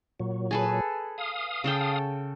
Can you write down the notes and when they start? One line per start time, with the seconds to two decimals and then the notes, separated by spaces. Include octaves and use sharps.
0.20 A#2 F#3
0.51 G#4 A4 B4
1.18 F5 D#6
1.64 C#3 A4 G5